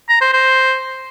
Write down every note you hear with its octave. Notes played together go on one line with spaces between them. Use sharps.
A#5
C5
C5